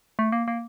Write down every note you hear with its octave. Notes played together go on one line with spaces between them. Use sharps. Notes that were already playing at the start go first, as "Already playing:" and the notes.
A3
A#3
A#3